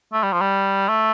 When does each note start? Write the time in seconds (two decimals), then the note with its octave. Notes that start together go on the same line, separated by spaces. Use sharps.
0.13 A3
0.23 G3
0.33 F3
0.41 G3
0.88 A3